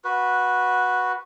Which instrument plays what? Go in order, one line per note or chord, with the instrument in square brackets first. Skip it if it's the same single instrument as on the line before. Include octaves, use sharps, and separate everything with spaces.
[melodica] F#4 B4